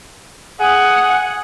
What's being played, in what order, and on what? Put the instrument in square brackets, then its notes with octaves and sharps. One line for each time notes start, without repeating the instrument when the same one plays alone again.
[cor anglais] G#4 [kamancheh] F#5